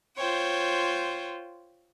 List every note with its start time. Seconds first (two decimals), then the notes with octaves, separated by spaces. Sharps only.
0.18 F4 C5 C#5 G5